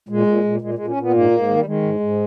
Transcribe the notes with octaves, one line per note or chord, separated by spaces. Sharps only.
A#2 G#3
A#2
A#2
A#2 G#3
A#2 G#3
C#4
A#2 B3
G#2 A#3
G#2
D#3
G3
D#3 G#3
G#2
G#2